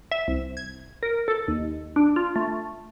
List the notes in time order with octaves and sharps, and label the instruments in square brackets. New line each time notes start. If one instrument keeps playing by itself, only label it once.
[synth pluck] E5
C2
G#6
A#4
A4
D#2
D4
F4
A3